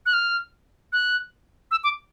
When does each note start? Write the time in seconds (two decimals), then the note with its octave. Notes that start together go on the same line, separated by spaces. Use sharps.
0.06 F#6
0.13 F6
0.93 F#6
1.71 E6
1.84 D6